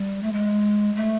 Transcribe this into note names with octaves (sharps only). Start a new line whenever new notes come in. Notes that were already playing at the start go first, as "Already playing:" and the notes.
Already playing: G3
A3
G#3
A3